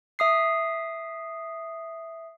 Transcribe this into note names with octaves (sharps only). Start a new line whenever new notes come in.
E5 D#6 C7